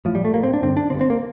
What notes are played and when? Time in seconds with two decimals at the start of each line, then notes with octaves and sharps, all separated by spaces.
0.05 A2 F3
0.15 G3
0.25 A3
0.34 A2 A#3
0.43 C4
0.53 D4
0.62 G2 D3 C4
0.77 D4
0.90 G2 D3 C4
1.01 C4
1.10 A#3